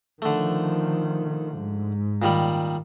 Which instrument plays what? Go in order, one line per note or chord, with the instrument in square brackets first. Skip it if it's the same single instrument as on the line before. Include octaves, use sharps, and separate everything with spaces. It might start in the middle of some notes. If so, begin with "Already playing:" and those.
[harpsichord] D3 A3 [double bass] D#3 F3
[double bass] G#2
[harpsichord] A#2 D#3 G3